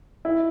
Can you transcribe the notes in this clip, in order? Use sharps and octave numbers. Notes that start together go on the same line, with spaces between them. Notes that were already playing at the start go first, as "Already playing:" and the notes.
E4